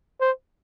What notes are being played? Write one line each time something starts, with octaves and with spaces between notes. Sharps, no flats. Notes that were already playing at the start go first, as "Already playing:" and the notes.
C5